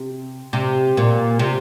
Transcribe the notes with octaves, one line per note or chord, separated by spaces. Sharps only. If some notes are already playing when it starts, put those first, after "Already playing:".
Already playing: C3
C3
A#2
C3